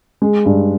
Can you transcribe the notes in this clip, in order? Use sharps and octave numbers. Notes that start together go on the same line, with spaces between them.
G#3
G2